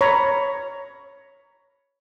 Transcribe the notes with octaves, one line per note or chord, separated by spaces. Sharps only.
C#5 A#5 B5